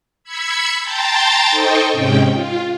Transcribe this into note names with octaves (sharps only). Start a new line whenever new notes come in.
B5 E6 G#6 B6 C#7
G5 A5 A#5 C6 G6 A6
D#4 A4 C5 D#5 G5 C#6
G#2 C3 G#3 C#4 G5
F4